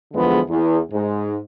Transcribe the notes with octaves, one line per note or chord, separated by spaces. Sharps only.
E2 D3 F3 G#3 B3
E2
G#2